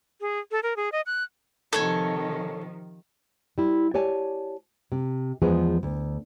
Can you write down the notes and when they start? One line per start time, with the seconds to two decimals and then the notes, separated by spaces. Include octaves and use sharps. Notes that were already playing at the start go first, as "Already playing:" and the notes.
0.21 G#4
0.51 A4
0.63 A#4
0.76 G#4
0.92 D#5
1.06 F#6
1.73 C3 D#3 F3 A4 C#5 G#5
3.58 G3 E4
3.94 G4 C#5 D5 G#5 A5
4.92 C3
5.42 E2 F3 G#3 B3 G#4
5.83 D2